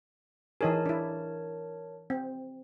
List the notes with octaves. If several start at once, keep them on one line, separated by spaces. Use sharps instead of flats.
E3 D#4 G#4 A#4 C#5 A5
D4 E4
C4